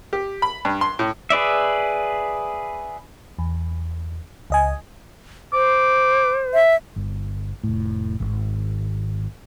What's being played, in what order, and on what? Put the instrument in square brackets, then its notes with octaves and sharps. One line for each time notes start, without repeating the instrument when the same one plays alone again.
[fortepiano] G4
B5
G2
C6
A2
[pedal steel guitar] G#4 B4 D5 E5
[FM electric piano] E2
C#2 D#5 G#5
[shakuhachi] C5 [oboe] D6
[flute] E5
[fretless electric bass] G1
F1 A2
G#1